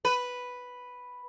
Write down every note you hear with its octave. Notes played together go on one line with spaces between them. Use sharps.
B4